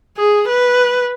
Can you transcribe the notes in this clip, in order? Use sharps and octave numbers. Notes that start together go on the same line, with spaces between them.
G#4
B4